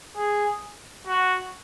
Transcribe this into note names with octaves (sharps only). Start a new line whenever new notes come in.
G#4
F#4